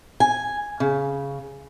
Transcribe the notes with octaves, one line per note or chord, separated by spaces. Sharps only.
G#5
C#3